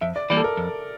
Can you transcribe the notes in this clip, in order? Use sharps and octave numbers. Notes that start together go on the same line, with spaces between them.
F2 E5
D5
E3 G3 A#3 D5
A4
A#4
F2